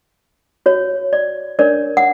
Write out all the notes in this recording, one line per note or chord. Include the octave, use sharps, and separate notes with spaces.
F#4 C#5
D5
D4 A#4 C#5 D5
F#5